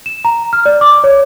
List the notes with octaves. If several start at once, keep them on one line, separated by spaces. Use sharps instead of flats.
E7
A#5
F6
D5
D6
C#5